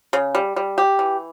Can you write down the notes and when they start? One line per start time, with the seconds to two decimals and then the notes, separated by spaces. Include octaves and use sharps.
0.13 C#3
0.35 G3
0.56 G3
0.78 G4
0.99 E3